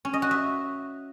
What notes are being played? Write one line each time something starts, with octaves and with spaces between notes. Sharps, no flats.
C#4
D#5
F#4
E5